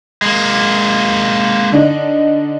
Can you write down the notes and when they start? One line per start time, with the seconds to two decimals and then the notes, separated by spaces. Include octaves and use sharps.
0.22 G#3 A#3
1.72 D3 D4 D#4